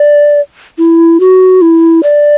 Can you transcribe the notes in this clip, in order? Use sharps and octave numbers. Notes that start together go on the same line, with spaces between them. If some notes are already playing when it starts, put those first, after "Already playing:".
Already playing: D5
E4
F#4
E4
D5